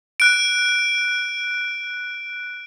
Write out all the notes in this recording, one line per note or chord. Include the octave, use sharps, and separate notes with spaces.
F#6 D7